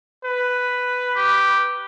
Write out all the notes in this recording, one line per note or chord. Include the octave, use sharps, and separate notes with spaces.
B4
G4